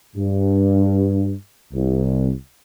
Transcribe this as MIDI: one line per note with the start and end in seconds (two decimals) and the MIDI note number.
0.16 1.33 43
1.74 2.30 36